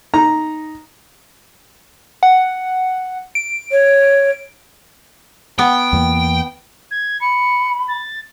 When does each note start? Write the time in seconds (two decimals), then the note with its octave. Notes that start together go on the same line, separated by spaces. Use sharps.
0.14 D#4 A#5
2.23 F#5
3.35 D7
3.72 C#5
5.59 B3 G5
5.93 E2 E3 A#3
6.91 G#6
7.21 B5 C#7
7.88 A6